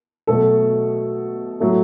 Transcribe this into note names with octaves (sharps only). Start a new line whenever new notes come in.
B2 F#3 A3 A4
A2 F#3 A3